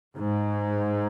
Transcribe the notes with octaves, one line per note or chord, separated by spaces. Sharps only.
G#2